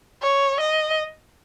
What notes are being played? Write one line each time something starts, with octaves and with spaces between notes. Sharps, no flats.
C#5
D#5